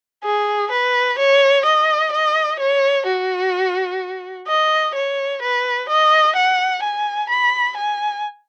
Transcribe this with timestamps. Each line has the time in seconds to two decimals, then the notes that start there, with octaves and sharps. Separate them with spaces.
0.24 G#4
0.71 B4
1.19 C#5
1.66 D#5
2.12 D#5
2.59 C#5
3.07 F#4
4.47 D#5
4.95 C#5
5.42 B4
5.89 D#5
6.36 F#5
6.83 G#5
7.30 B5
7.77 G#5